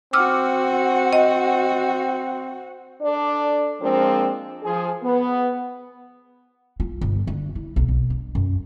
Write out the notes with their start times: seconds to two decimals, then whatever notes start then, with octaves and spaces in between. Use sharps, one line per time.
0.13 C4 F#4 F#5 D6 E6 F6
1.13 D#5
3.02 D4 A4 D5
3.81 F3 G#3 A#3 C4 D4
4.64 F3 G#4
5.02 B3
6.80 F4
7.01 G1
7.27 D3
7.55 E4
7.76 B1
7.88 B1
8.10 D4
8.35 F#2